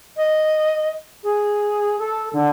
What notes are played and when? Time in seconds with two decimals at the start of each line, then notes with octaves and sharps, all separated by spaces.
0.17 D#5
1.24 G#4
1.99 A4
2.33 D3